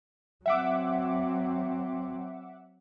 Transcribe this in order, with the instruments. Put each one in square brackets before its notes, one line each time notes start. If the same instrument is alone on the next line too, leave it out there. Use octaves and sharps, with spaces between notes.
[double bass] F#3 C4 [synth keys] E5 F#5 D6